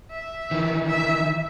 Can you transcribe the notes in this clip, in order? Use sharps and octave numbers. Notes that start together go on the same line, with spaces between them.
E5
D#3 E3
E5